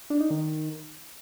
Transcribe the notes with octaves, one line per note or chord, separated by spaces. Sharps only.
D4
D#4
D#3